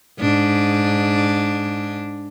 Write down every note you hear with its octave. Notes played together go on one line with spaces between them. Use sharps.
G#2 D4